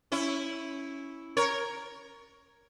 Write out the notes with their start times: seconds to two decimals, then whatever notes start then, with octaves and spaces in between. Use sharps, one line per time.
0.12 C#4 E4
1.37 A#4 C#5